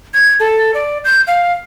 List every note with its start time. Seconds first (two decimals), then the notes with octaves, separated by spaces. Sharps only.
0.14 G#6
0.40 A4
0.74 D5
1.04 G6
1.27 F5